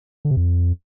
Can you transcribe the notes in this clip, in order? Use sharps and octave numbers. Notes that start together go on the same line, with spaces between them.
D3
C3
F2